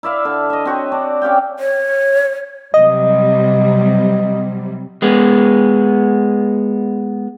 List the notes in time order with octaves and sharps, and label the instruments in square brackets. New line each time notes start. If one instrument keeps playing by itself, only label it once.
[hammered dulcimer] E4 D5 E5 F5
D3
D#5 E5
C4 F#4 C#5
D4 D5
C#4 G4 F5 G5
[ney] C#5
[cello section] C3 F#3 G3 [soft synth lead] D#5
[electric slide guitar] G#3 B3